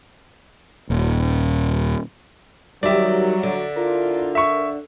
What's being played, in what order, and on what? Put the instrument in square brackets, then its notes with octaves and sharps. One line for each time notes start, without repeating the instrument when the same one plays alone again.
[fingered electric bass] D#1
[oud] D#3 G4 [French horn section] F#3 [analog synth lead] G3 [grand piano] D5 E5
[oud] D3
[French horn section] D4 E4 F4 [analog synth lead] A#4
[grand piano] E5 C#6